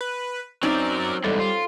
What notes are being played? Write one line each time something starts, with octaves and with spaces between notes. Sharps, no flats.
B4
F#3 C4 C#4 D#4 A#4 D5
E2 G#2 G3 A4
F4